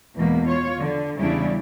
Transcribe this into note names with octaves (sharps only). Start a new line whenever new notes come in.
E2 B2 G#3 A#3
F4 C#5
D3
E2 C#3 G3 D4 E4